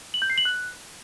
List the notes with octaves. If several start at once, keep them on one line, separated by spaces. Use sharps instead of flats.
F#7
G6
C7
F#7
F#6